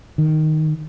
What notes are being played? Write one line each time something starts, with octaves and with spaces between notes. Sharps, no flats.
D#3